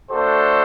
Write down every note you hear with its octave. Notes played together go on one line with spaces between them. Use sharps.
A3 D4 F#4 A4 C5